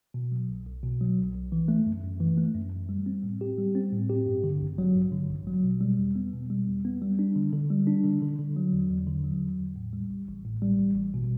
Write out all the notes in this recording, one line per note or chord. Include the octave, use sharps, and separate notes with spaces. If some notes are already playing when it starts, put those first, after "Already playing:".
B2
F#3
B1
B1
B2
F#3
B1
B1
E3
A3
F#2
F#2
E3
A3
F#2
F#2
G3
C4
A2
G4
G3
C4
A2
G4
G2
D3
A1
F#3
G2
D3
A1
F#3
B2
G3
E2
B3
B2
G3
E2
B3
G3
D4
D3
D3
G3
D4
D3
D3
D3
F#3
E2
E2
D3
F#3
E2
E2
A2
G3
A1
A1
A2
G3
A1
A1
B2